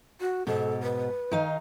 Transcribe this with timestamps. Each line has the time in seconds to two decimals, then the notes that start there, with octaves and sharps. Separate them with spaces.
0.20 F#4
0.47 G#2 B2 A4
0.83 B4
1.31 D#3 D#4 F5